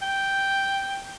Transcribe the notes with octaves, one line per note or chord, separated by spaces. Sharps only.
G5